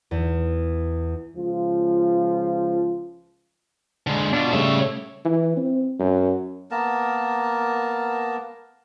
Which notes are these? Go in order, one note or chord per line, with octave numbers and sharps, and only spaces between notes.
E2
C#2 F3 F4
D3 G#3
B2 D4 F4
C#3 G3 A3 C#5 E5
E3
C4
F#2
A#3 B3 A#4 A5